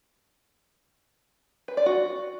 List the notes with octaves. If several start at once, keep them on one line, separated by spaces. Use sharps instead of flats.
B4
D5
F#4